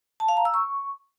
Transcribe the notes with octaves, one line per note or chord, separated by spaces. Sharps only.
A5
F5
A#5
E6
C#6